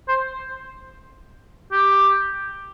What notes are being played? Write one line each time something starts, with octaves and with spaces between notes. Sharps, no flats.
C5
G4